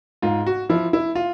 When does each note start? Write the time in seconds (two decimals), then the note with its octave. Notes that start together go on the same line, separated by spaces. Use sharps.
0.22 G#2 F4
0.46 F#4
0.69 F3 E4
0.93 E4
1.15 F4